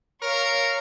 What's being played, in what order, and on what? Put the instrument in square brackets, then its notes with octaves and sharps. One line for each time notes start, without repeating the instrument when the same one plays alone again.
[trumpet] A#4 [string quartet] C#5 F5